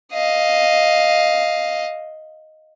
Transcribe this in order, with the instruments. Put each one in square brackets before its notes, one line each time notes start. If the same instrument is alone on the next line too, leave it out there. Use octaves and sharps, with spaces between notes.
[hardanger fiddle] D#5 F5